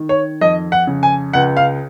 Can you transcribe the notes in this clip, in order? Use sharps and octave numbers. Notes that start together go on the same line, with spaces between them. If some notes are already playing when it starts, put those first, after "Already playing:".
Already playing: D#3
C#5
F2 D#5
F#5
C#3
G#5
C#2 F#5
F5